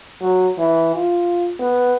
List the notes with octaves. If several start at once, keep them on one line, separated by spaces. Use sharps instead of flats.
F#3
E3
F4
B3